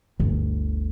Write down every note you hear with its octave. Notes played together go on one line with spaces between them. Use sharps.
G1 D2